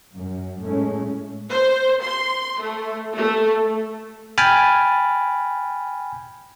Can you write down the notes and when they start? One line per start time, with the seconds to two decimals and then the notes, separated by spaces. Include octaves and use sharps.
0.12 F#2
0.61 A2 G#3 A3 C#4
1.51 C5
2.03 C6
2.61 A3
3.17 A3
4.38 G5 G#5 B5 F6 A6